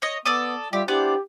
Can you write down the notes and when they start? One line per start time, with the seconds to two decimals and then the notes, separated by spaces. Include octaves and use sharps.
0.02 C#5 D#5
0.25 B3 A4 D5 D#6
0.73 G3 F4 G4 E5 G5
0.88 B3 D4 E4 G4 C5 D5